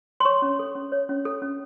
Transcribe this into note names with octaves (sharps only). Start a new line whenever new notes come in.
C6
C#5 C#6
C#4
A4
C#4
C#5
C#4
A4
C#4